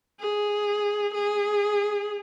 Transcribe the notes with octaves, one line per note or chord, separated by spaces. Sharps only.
G#4
G#4